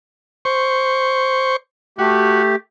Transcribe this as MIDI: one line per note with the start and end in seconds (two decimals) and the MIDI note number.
0.45 1.56 72
0.45 1.56 85
1.98 2.56 57
1.98 2.43 66
1.98 2.56 67